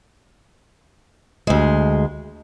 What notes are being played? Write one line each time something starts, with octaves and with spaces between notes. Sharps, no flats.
D2 G#3